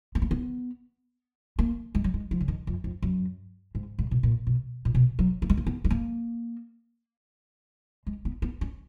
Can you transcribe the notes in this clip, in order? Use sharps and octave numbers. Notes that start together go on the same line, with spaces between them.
B3
A#3
B3
A#3
G#3
F#3
G#3
F3
C#3
D#3
F2
F2
F#2
G#2
G#2
B2
A#2
B2
A#2
B2
F#3
A#3
G#3
A#3
B3
G#3
A#3
G#3
B3
B3
C#4